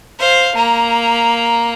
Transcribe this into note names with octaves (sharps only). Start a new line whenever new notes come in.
C5 F5
A#3 A#5